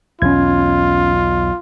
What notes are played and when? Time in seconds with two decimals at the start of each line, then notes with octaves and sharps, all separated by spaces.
0.22 B1 E2 B2 C#4 F4 G#6